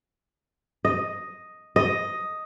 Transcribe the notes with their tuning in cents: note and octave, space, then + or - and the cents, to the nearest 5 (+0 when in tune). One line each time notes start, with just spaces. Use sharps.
D#5 +0
D#5 +5